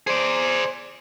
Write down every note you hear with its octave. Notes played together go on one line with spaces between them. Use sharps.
G#4 C5 D5